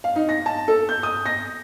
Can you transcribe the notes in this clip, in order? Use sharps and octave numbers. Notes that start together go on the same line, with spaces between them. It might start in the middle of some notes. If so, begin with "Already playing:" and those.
F5
D#4
A#6
A5
A4
G6
D#6
A#6